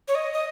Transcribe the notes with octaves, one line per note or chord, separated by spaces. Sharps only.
C#5
D#5
D#5